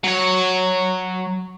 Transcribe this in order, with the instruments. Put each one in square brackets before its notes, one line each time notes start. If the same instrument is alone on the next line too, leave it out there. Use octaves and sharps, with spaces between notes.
[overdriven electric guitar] F#3 C#5